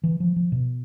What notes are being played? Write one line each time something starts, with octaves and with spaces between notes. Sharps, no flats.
E3
F3
F3
B2